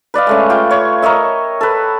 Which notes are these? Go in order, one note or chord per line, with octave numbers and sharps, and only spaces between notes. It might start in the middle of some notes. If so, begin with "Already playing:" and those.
B4 D5 D#5 F5
G#3 A3 C#4
F4 G5 D6
C#5
A#4 C#5 D#5 E5
A4 B4